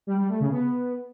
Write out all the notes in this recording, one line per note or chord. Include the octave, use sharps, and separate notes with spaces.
G3
G3
A3
C#3
B3